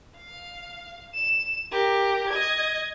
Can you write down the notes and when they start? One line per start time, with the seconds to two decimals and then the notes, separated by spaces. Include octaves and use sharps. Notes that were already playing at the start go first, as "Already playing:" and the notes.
0.18 F5
1.14 E7
1.72 G4 A#4
2.29 D#5 G#6